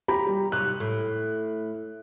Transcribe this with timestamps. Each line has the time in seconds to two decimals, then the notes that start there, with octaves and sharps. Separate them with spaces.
0.08 G4 A#5 B5
0.27 G3
0.52 F#2 C3 D#4 F#6
0.80 A2